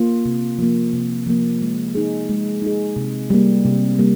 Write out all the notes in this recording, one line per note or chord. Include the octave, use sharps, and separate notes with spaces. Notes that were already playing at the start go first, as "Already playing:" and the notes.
Already playing: A#3 F4
C3
F3 A#3
C3
F3 A#3
G#3
D#4 G#4
G#3
D#4 G#4
C3
G3 A#3
C3
G3 A#3